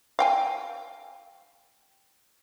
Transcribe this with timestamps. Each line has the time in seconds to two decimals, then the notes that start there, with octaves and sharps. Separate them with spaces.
0.19 F5 G5 G#5